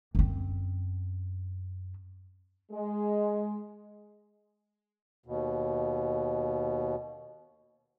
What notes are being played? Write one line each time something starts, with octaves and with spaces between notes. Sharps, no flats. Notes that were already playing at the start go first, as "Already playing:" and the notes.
F#2 C4
G#3
D#2 B2